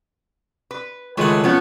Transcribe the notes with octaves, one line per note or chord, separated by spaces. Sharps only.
B4
C#2 D#3 E3 G#3 A3 F#5
F3 A3 B3 C#4